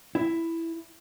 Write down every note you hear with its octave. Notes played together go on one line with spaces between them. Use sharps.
E4